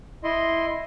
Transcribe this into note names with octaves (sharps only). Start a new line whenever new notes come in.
E4 D#5 C6